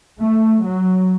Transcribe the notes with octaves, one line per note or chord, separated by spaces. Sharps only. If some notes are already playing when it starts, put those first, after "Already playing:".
A3
F#3